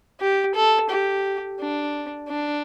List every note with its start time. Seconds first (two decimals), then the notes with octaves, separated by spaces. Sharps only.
0.20 G4
0.55 A4
0.90 G4
1.59 D4
2.28 D4